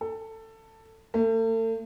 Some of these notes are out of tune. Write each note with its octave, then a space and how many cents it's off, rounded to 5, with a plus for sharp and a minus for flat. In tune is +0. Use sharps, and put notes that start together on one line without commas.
A4 +15
A3 +40